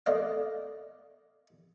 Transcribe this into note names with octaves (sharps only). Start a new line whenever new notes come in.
A3 D5 D#5 F5